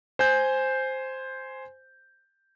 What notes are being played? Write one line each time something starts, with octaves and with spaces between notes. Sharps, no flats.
C5 G#5 G6